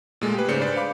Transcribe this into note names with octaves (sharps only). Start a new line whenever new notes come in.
A#2 G#3 A3
G4 G#4 B4
G#2 C#3 C5 D5 G6 C#7
D4 B4 C5 D5
F5 B5 D6